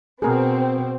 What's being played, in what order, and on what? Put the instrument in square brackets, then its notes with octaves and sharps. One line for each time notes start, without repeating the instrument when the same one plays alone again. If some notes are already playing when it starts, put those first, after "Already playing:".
[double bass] B2 [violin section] C4 [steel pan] G#4 A#4